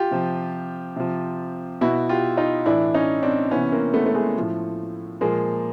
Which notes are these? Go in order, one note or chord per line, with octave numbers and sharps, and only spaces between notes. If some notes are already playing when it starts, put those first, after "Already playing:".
Already playing: F4 G4
C3 F3
C3 F3
B2 E4 F#4
F4 G4
D#4 F4
A2 E3 D4 E4
C#4 D#4
C4 D4
C3 E3 B3 C#4
A#3 C4
A3 B3
A3
G#3
A2 F3
A#2 F3 G#3 A#3